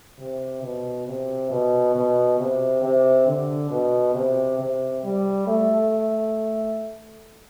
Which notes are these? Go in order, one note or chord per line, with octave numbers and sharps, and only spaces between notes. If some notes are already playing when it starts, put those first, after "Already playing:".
C3
B2
C3
B2
B2
C3
C3
D3
B2
C3
C3
G3
A3